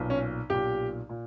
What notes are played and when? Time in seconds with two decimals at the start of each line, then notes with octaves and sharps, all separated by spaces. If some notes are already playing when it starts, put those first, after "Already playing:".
Already playing: B1 A#2
0.10 C#4
0.50 B1 A#2 G4
1.09 A#2